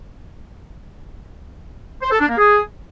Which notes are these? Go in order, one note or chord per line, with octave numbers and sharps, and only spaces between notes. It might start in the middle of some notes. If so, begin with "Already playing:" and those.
C5
A4
D4
A#3
G#4